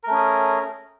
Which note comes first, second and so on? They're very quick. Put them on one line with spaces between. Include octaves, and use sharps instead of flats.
A#4 A3 C#4 G#4